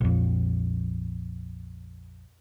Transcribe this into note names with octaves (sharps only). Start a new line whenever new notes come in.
A#1 F2